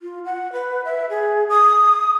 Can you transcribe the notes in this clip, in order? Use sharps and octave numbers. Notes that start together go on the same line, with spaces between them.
F4
F#5
B4
E5
G#4
D#6